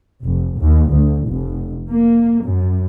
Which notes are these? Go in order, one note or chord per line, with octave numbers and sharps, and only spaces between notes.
F1
D#2
D2
F1
A#3
F#2